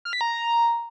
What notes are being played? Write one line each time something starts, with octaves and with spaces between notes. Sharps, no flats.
F6
B6
A#5